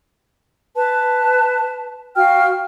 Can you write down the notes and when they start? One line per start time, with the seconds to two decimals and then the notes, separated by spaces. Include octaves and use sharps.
0.75 B4 A5
2.15 F#4 F5 G5 F6